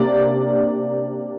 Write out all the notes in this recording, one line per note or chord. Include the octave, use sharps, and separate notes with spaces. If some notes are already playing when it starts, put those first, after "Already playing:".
Already playing: C3 A#3 D4 D5